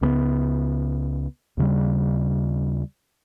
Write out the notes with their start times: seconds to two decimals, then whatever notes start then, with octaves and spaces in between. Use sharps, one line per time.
0.01 C#2 C#3 G3 B3
1.57 D#2 C#3 G3